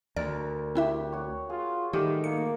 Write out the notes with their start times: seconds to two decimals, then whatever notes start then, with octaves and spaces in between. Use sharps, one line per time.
0.17 D2 A#4 D5
0.75 C4 E4 G4 E5 F#5 B5
1.12 F#4 C#5
1.50 F4 G#4
1.93 A2 D#3 G3 G4 G#5 D6
2.24 A#2 A#3 C#7